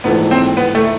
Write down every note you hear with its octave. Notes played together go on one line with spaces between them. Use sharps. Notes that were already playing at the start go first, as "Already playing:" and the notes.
A#1 G#2 E3 A3 B3
C4
B3
A3